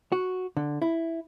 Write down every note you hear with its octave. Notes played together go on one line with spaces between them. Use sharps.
F#4
D3
E4